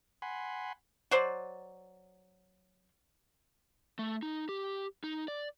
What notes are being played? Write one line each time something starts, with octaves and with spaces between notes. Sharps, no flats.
F#5 G#5 B5 C6
F#3 C5 D5
A3
D#4
G4
D#4
D5